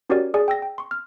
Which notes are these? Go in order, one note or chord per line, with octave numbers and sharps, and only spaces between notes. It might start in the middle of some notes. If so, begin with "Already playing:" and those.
C#4 F#4 G4 A#4 C#5 D5
G#4 D5 G#5
G5 E6 A#6
G5
C6 C#6
F6